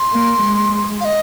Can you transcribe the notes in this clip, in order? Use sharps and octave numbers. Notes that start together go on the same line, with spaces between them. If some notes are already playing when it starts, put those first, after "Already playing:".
Already playing: C6
A#3
G#3
F5
D#5